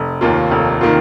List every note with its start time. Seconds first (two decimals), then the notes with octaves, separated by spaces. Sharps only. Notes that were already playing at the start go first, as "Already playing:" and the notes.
Already playing: F1
0.21 D#2 D#3 A#3 F4
0.51 F1
0.81 D#3 A#3 F4